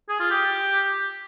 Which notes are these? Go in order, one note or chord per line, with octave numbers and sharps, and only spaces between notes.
G#4
F4
G4